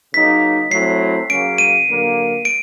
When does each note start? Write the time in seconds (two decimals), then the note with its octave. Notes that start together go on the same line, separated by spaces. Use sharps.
0.13 C#3 F#3 A#3 D#4 B6
0.71 F#3 A3 C4 E4 C7
1.30 C#3 F#3 A#3 C#4 D7
1.58 D#7
1.88 D3 F#3 A#3
2.45 D7